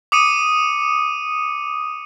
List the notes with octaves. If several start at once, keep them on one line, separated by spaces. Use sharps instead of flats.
D6 D#6 C#7 D#7